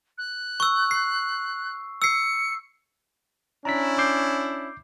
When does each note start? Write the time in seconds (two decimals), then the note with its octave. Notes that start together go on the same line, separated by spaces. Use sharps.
0.18 F#6
0.60 C#6 E6
0.91 C7
2.02 E6 C7 C#7
3.65 C#4 D4 E4 A#5 B6
3.98 D6 G6 C7